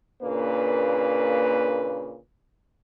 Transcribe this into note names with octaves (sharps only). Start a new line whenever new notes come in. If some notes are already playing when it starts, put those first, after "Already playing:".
A#2 C#3 A#3 D4 B4